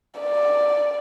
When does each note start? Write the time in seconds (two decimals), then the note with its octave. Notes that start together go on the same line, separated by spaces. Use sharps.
0.20 D5